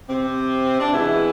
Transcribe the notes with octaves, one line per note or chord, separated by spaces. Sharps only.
C3 C4
D4
B2 E3 G#3 E4